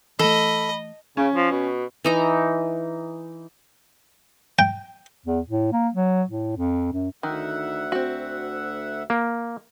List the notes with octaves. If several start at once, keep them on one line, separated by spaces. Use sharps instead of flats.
E3 A3 A4 D#5 B5
C#3 C#4
F3
B2
E3 D#4 A#5
G5
E2
A2
A#3
F#3
A2
F2
F#2
D2 D#3 E5 F#5
C4 F#4
A#3